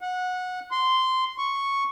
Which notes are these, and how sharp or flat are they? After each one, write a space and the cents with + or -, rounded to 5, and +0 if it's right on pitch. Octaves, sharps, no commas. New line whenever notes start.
F#5 -20
C6 -10
C#6 -5